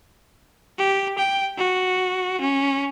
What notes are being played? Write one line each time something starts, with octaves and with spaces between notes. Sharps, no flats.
G4
G5
F#4
C#4